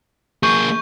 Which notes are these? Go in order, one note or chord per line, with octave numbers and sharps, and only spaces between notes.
A#3 G#4 C#6 G6